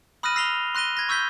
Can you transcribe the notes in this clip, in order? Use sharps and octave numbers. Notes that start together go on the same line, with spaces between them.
B5 D#6 F6 F#6 A#6 D#7
E6 A#6 C7 F7 G7
C6 F#6 A#6 D#7 G7
G#6 A#6
C#6 E6 G6 B6 G7